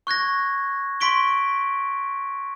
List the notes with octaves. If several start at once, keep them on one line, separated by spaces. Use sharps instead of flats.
C#6 F#6 G#6 A#6
C6 C#6 B6 D7 G7